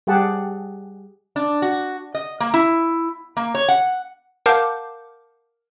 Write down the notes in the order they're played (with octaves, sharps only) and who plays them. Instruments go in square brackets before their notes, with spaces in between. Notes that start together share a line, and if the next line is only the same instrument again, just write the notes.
[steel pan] G3 G4 G#4 F#5 A5
[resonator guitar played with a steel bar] D4
F#4
D#5
A#3
E4
A#3
C#5
F#5
[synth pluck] A#4 F5 F#5 A5 D6 G6